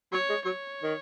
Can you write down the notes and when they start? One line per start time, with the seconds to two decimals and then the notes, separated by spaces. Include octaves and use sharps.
0.12 F#3 C#5
0.29 G#3
0.45 F#3 C#5
0.83 D#3